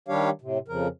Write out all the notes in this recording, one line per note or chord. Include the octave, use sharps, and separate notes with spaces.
D#3 G3 D4 G4 C#5 F5
A2 C3
F2 C#3 F3 A#4